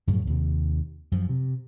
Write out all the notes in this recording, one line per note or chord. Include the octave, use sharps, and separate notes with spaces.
F#2 A2 C#3 F3
D#2 C3
F#2 F3
C3